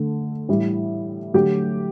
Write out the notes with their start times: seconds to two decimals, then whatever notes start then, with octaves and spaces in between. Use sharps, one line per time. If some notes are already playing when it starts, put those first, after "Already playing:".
Already playing: D3 A3
0.49 A2 E3 G3
1.34 D3 F#3 A3 G4